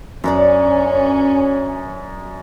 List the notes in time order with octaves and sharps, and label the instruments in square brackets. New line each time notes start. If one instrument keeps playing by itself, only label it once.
[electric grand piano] F#2 [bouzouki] B3 D4 D5 [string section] C#4